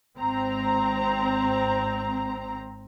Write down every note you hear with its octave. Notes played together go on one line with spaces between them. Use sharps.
G#1 C4 A#5